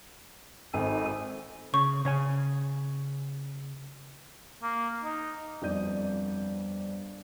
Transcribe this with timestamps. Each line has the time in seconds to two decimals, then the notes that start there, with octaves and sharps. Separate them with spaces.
0.74 G#1 C4 A4 G#5
1.74 C#3 C#6
2.05 C#3 C#5 G#5
4.62 A#3
5.04 D#4
5.62 G1 F2 D5 G6 D#7